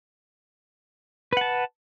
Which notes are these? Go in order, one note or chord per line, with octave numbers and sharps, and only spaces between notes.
B4 F#5 A5